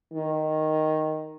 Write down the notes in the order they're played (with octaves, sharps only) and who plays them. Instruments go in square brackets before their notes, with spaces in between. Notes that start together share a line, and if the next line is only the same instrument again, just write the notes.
[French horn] D#3